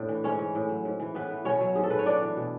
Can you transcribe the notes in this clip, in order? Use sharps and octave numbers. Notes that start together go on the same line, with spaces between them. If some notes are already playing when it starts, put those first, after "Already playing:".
Already playing: A2 D4 D5
E3
G#2 C#4 C#5
E3
A2
F#3
G#2
E3
A2 B3 B4
E3
B2 C#4 C#5
F#3
G#2 G#4
A4
F#3 B4
C#5
A2 D4 D5
E3
B2